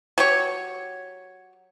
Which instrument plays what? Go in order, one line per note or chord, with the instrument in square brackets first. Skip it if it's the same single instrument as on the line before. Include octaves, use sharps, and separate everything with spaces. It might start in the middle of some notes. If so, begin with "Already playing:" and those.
[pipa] F#3 G4 C#5